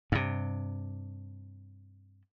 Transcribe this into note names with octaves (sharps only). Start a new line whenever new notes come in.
G2 C3